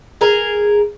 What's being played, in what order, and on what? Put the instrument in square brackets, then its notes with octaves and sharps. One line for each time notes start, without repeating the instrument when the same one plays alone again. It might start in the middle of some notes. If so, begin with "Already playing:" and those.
[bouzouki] G#4 A#4